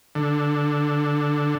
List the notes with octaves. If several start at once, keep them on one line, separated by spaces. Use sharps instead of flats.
D3